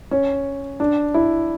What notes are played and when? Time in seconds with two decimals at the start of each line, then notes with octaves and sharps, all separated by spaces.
0.11 C#4
0.80 D4
1.14 E4